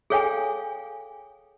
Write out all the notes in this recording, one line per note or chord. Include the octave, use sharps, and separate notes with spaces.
G#4 A4 C#5 F5 G5 G#5